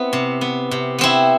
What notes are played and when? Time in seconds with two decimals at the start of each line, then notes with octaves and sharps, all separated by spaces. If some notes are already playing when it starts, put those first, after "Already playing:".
Already playing: B3 C4 E4
0.13 C3
0.41 B3
0.71 C3
0.98 B3 C4 E4